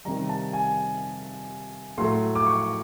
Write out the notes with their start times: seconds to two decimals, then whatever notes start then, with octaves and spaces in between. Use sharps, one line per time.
0.05 C3 D#3 G3 A#5
0.29 A5
0.53 G#5
1.98 A2 F#3 A3 C6
2.35 D6
2.46 C#6